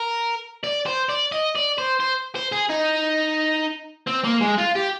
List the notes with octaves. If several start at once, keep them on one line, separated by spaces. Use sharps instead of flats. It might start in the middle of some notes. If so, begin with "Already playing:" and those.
Already playing: A#4
D5
C5
D5
D#5
D5
C5
C5
C5
G#4
D#4
C4
A#3
G#3
F4
G4